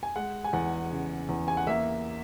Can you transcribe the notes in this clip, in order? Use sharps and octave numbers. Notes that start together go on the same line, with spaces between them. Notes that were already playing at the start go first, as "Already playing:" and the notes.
G#5
G#3 F#5
G#5
E2 F#5
C#3
E2
G#5
F#5
A#3 E5